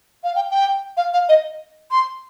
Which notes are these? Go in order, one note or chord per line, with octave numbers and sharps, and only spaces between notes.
F5
G5
G5
F5
F5
D#5
C6